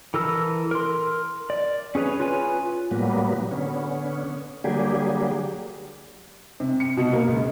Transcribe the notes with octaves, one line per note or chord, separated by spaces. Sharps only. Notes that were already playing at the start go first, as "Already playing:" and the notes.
E3 A4 A#4 E6
A#4 C6
D5
C#4 G#4 B4 C#5
F4 B4 C#5 G#5
A2 F#3 G3 A#3 B3
D3 B3 C#4
D3 F#3 G3 A#3 G4 G#4
C3
C#7
B2
A#3
C#2